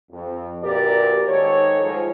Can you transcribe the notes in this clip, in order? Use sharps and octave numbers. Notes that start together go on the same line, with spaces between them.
F2
D2 A#2 G4 A#4 B4 D5
G#2 D#3 A4 C#5
G#2 F3 G#3